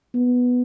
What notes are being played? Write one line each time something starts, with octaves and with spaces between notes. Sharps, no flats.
B3